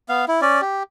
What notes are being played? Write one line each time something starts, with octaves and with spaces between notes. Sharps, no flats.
B3 F5
E4
C#4 D5
G4